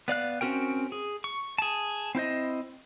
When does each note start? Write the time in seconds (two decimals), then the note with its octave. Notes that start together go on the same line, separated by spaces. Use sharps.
0.08 B3 D5 F5 F#6
0.41 C4 C#4 F#4 A#4 G5
0.92 G#4
1.24 C#6
1.58 G#4 A5
2.15 C4 E4 C5 D#5